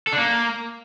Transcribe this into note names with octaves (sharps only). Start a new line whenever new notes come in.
A4
D4
A#3